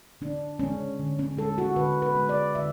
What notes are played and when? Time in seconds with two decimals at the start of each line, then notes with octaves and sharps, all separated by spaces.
0.21 D3 D4
0.59 G#3 C#4
1.00 D3
1.19 C#4
1.37 G#3 A4
1.58 F#4
1.76 D3 B4
2.02 B4
2.15 G#3
2.29 D5
2.55 D3 E5